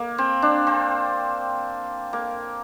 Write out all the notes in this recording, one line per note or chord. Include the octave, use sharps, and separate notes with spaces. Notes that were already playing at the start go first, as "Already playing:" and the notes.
Already playing: A#3
C4
D4
C4
A#3